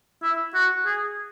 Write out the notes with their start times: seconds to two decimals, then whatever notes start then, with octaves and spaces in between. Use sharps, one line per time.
0.23 E4
0.54 F#4
0.86 G#4